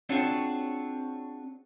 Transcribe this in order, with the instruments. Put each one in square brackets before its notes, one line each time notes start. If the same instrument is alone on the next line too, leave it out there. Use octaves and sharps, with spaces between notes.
[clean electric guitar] C4 D4 F4 F#4 G#4 C#5